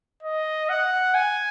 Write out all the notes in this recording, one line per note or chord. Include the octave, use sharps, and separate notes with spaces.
D#5
F#5
G#5